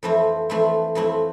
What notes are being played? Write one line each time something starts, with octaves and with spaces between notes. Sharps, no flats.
F2 E3 A3 C4 E4
F2 E3 A3 C4 E4
F2 E3 A3 C4 E4